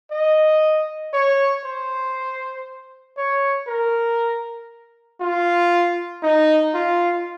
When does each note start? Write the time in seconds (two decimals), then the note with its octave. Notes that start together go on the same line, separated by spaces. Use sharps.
0.11 D#5
1.13 C#5
1.65 C5
3.17 C#5
3.68 A#4
5.20 F4
6.22 D#4
6.74 F4